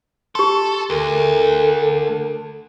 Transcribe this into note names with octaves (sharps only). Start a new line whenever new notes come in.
G4 A4 C6
D2 A4 A#4